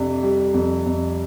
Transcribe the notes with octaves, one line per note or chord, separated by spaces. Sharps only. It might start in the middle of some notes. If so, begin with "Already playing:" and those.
Already playing: F2 C3 D4
G3
F2
F2